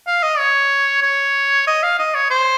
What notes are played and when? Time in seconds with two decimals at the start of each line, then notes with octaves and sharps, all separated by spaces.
0.07 F5
0.23 D#5
0.38 C#5
1.02 C#5
1.67 D#5
1.83 F5
1.99 D#5
2.15 C#5
2.30 C5